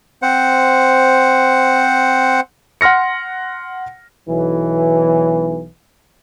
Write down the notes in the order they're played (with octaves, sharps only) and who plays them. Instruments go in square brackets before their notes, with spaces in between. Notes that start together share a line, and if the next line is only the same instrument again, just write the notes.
[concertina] C4 C5 F#5
[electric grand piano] F#5 C6 F6 A#6 C#7
[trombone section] B1 E3